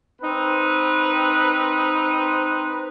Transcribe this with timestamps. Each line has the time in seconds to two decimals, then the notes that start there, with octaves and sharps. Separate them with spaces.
0.22 C4 D#4 B4